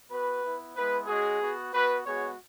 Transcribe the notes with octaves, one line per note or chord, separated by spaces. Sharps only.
B3 F#4 B4
B3 E4
G#3 B3 E4 B4
G#3 C#4 F#4 G#4
B3 F#4
B3 F#4 B4
G#3 B3 F#4 G#4 C#5